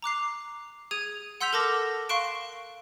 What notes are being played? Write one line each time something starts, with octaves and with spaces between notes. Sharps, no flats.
A#5 D6 F#6 C7
G#4 D#6 G#6 D#7
F#5 C6 E6 G6 B6 F7
A4 A#4 A5 D6 A#6
F5 C6 C#6 F#6 D7 E7